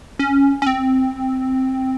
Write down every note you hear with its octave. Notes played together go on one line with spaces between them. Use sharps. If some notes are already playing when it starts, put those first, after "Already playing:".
C#4
C#4
C4